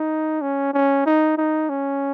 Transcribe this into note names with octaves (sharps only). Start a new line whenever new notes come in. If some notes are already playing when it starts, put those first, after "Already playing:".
Already playing: D#4
C#4
C#4
D#4
D#4
C#4